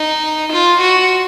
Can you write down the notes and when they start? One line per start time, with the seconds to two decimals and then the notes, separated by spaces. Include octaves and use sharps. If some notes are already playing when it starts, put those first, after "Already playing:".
Already playing: D#4
0.52 F4
0.81 F#4